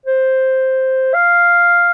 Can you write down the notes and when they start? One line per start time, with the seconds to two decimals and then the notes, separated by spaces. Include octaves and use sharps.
0.06 C5
1.14 F5